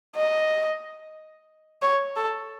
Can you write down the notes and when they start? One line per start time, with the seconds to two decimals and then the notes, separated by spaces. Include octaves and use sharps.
0.16 D#5
1.82 C#5
2.16 A4